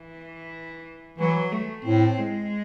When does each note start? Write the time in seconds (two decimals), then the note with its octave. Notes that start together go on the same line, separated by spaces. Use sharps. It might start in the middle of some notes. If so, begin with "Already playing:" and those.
Already playing: E3
1.18 E3 F#3
1.52 A3
1.85 A2 C4
2.18 G#3